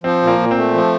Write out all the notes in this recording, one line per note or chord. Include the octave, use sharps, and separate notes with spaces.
F3 C4
A#2 A#3
A#2
C4
A3
F3